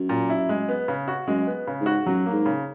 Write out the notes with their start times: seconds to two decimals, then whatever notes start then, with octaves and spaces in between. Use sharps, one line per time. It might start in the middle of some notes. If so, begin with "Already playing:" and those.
Already playing: F#2
0.09 A#2
0.30 E4
0.49 G#3
0.69 B3
0.88 C#3
1.08 F#4
1.27 F#2 G#3
1.47 B3
1.67 C#3
1.80 G#2
1.86 F#4
2.06 F#2 F#3
2.26 A#3
2.32 G#2
2.46 C#3